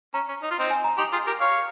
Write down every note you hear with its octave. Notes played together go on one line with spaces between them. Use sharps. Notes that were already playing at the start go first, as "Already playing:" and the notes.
C#4 A#5
C#4
D#4
F4
C4 D#4
G#5
A#5
D#4 G4 C6
F4 G#4
G4 A#4
C#5 F5